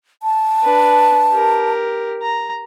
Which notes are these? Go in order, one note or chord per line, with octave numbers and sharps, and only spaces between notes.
A5
D4 B4
G4 A#4
A#5